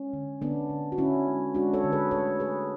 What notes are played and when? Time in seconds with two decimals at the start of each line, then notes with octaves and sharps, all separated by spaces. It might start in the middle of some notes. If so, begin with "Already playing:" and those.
Already playing: G#3 C#4
0.13 D3
0.42 D3 B3 D4
0.70 D3
0.92 F#4
0.98 D3 C#4 E4
1.27 G#3
1.54 G#3 D4 F#4
1.73 A4 C#5
1.84 D3
1.92 G#4 B4
2.11 A3 A4 C#5
2.40 A3 G#4 B4